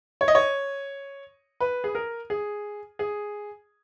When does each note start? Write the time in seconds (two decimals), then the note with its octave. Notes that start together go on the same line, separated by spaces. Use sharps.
0.21 C#5
0.28 D#5
0.35 C#5
1.61 B4
1.84 G#4
1.95 A#4
2.30 G#4
2.99 G#4